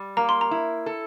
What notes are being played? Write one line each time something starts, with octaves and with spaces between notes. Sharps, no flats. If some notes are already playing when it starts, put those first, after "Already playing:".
Already playing: G3
A#3 A#5
C6
A#5
E4
A4